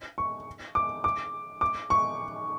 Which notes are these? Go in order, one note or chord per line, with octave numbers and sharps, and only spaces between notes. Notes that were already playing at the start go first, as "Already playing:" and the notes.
C#6
D6
D6
D6
C#6